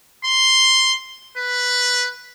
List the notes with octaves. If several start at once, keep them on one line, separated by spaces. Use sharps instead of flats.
C6
B4